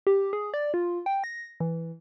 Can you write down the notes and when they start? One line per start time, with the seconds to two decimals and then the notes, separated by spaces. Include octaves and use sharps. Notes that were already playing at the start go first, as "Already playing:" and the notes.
0.07 G4
0.33 G#4
0.54 D5
0.74 F4
1.06 G5
1.24 A#6
1.60 E3